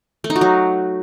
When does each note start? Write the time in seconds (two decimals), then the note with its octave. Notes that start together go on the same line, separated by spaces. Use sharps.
0.24 A3
0.30 D#4
0.36 F#4
0.41 F#3